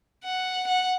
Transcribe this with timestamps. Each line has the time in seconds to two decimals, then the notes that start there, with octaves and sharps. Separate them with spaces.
0.24 F#5
0.67 F#5